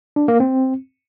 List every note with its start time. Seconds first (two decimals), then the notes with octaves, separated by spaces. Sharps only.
0.16 D4
0.28 A#3
0.40 C4